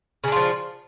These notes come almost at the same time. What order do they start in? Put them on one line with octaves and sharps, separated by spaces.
C#3 D4 F4 F3